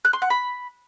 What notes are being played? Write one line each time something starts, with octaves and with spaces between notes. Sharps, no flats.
F#6
C6
F#5
B5